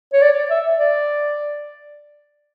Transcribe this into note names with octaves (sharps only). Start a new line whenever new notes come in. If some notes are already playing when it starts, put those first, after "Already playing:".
C#5
D5
E5
D5